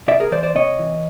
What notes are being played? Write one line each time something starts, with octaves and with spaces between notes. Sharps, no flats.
C3 D5 E5
G#4 A#4
E3 C5 D5
C5 D5
C3 C#5 D#5
E3